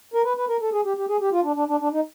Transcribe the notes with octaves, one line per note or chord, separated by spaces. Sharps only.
A#4
B4
B4
A#4
A4
G#4
G4
G4
G#4
G4
F4
D4
D4
D4
D4
D#4